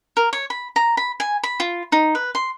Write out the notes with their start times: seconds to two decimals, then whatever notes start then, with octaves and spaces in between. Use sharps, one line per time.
0.17 A#4
0.33 C#5
0.50 B5
0.76 A#5
0.97 B5
1.20 G#5
1.43 B5
1.60 F4
1.92 D#4
2.15 B4
2.35 C6